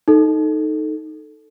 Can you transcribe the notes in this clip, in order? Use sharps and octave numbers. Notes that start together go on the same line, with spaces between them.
D#4 A4